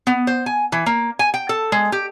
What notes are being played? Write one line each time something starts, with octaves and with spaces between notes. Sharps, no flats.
B3
C5
G#5
E3
A#3
G#5
G5
A4
G#3
G4